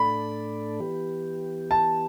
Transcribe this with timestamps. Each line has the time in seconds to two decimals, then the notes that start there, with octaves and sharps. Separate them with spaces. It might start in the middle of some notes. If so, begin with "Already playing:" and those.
Already playing: A2 A3 D4 A4 D5 B5
0.80 E3 B3 G4
1.71 A5